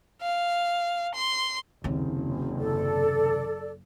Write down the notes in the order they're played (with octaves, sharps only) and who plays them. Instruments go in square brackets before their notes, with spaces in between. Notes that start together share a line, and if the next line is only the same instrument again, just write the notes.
[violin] F5
C6
[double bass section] F#1 [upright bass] D#2 C3
[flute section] A4 D5